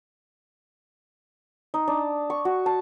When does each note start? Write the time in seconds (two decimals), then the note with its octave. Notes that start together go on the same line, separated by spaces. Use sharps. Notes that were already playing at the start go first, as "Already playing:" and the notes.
1.74 D#4
1.88 D4
2.30 C#6
2.45 F#4
2.66 A5